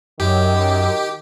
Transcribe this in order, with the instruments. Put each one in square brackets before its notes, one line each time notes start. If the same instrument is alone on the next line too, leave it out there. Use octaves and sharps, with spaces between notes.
[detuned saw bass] F#2 [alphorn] D#3 [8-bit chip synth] G4